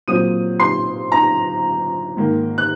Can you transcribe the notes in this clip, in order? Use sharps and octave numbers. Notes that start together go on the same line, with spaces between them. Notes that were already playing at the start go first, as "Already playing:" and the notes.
A#2 F#3 C4 D#6 D#7
C6 C7
A#5 A#6
G#2 D#3 A#3
F#6